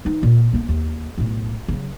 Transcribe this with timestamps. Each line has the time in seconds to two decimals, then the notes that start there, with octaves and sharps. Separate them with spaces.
0.05 E3 D#4
0.23 A#2
0.53 A#3 B3
0.69 D#2
1.18 B1 A2
1.68 C#3 F#3